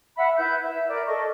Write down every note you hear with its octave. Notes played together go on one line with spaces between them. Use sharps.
E5 F#5 B5
E4 B4 E5 G6
B4 E5
A#4 D5
A4 D#5 C#6